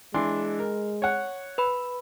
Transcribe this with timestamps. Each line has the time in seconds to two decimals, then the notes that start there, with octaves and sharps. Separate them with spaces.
0.14 E3 G#3 D4 C6
0.59 A#4
1.02 C#5 F#5
1.58 B4 B5